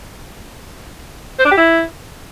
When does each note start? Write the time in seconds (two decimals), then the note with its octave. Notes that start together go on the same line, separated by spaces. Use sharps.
1.39 C5
1.45 D4
1.51 G4
1.57 E4